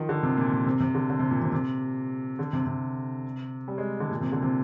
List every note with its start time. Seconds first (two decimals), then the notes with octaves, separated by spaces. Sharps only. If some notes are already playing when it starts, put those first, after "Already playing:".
Already playing: D#3 F3
0.09 D3
0.23 C3
0.37 A#2
0.52 A#2
0.66 C3
0.80 C3
0.95 D3
1.10 D3
1.19 C3
1.31 A#2
1.42 C3
1.52 C3
2.39 D3
2.53 C3
2.67 C3
3.68 G3
3.78 G#3
4.00 D3
4.11 A#2
4.21 C3
4.32 D3
4.42 C3